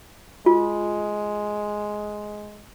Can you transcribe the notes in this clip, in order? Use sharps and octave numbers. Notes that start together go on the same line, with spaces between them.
G#3 F4